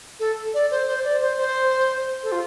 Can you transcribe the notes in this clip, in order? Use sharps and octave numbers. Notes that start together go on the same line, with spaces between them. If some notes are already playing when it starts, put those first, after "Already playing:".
A4
D5
C5
C5
D5
C5
C5
A4
F4